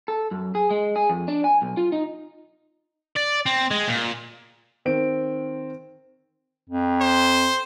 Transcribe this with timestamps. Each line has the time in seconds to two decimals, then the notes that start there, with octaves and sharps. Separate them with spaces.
0.08 A4
0.31 F#2
0.55 G#4
0.71 G#3
0.96 G#4
1.10 F2
1.28 D4
1.44 G#5
1.62 B1
1.77 F4
1.92 D#4
3.16 D5
3.46 C4
3.71 G#3
3.88 A#2
4.85 D#3 C4 D7
6.69 F2
7.00 C5